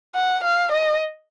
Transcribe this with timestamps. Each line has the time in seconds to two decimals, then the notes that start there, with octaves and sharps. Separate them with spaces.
0.15 F#5
0.44 F5
0.72 D#5